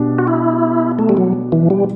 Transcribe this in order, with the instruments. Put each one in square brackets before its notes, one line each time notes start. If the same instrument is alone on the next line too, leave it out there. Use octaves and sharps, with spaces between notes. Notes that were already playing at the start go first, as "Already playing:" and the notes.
Already playing: [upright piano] B2 D4 G4
[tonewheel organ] F#4
E4
A3
G3
F#3
E3
G3